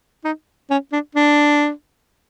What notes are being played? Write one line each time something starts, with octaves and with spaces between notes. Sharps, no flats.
D#4
C#4
D4
D4